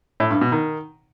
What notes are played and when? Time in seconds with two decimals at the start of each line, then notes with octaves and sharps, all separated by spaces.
0.20 A2
0.31 G2
0.41 B2
0.52 D#3